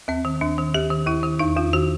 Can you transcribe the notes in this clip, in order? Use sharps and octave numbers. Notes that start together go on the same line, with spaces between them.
D#2 C4
D#3
D#2 D4
D#3
D#2 G4
D#3
D#2 E4
D#3
E2 D#4
E2 F4
D#3 F#4